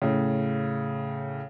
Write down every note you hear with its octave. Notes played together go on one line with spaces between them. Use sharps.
A2 C#3